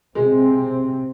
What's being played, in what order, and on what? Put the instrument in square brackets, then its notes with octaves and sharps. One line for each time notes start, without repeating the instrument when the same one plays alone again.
[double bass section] C3 C4 [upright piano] G#3